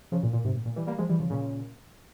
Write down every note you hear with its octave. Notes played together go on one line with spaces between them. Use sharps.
C#3 F3
A#2
A#2
G#2 C3
A#2
A#2
E3 G3
G3 A#3
F3 G#3
E3 G3
C#3 F3
A#2 C#3